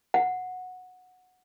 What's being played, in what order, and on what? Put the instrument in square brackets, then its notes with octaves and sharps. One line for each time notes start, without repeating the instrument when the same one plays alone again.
[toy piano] F#5